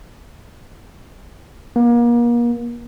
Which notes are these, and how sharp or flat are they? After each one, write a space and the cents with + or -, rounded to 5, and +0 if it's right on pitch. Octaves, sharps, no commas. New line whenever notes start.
A#3 +35